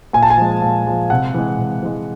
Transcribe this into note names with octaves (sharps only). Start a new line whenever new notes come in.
A#2 G#5
A5
G#5
F3 G#3
A#2
F3 G#3
C3 F#5
E3 G#3
C3
E3 G#3